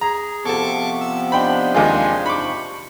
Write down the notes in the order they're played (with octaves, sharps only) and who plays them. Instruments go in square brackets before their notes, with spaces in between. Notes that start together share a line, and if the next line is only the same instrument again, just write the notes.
[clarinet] G#4 [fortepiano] A#5
[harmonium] C3 F3 [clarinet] B3 [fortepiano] A4 A5 [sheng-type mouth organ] C#6 D6
[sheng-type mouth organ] E6
[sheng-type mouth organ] D4 D#4 C5 [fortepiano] G5 B5
[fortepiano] D#2 G#3 F4 [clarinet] G#5
[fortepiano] B5 D6 [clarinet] C#6